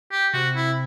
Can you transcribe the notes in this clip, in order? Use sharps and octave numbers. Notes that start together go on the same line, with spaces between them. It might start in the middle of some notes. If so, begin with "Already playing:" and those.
G4
C3 F#4
E4